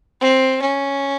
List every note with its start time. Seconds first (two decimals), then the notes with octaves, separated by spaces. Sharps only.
0.21 C4
0.62 C#4